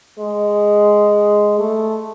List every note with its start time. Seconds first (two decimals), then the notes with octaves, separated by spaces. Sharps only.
0.19 G#3
1.59 A3